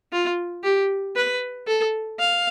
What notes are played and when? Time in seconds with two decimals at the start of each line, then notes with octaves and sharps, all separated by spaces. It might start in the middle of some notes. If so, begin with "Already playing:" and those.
0.12 F4
0.63 G4
1.15 B4
1.67 A4
2.19 F5